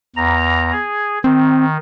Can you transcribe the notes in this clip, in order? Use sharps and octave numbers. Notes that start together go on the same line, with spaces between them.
E2 A#5
G#4
D#3 C4